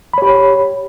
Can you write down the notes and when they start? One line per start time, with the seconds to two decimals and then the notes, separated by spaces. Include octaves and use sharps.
0.14 B5
0.18 C#5
0.22 G4